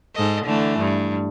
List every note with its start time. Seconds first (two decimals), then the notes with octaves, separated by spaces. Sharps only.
0.15 G#2 A4 D#5
0.45 D3 E3 A3
0.79 G2